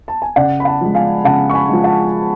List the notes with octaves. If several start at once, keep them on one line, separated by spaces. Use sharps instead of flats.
A5
G#5
C#3 D5 F#5
B5
F#5 A5
F3 G#3
F5 G#5
C#3 F#5 A5
C#6
G#5 B5
F3 G#3
F#5 A5